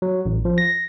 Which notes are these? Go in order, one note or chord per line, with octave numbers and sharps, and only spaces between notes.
F#3
A1
F3
A#6